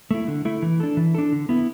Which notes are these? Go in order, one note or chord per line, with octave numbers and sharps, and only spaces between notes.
A3 E4
D3
A3 E4
E3
D4 A4
E3
D4 A4
D3
B3 E4